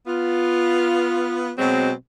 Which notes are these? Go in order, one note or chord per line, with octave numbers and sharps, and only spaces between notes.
B3 F4
B2 F#3 G#3 C4